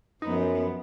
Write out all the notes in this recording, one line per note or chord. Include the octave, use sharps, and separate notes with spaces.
F#2 F3 B3 D#4